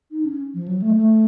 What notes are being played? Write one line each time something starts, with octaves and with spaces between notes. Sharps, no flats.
D#4
C#4
F3
F#3
A3
A3